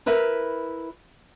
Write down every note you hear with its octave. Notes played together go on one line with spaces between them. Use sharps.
E4 A#4 B4 E5